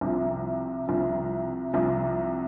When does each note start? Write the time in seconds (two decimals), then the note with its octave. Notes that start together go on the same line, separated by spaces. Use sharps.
0.01 C2 C3 F3
0.88 C2 C3 F3
1.73 C2 C3 F3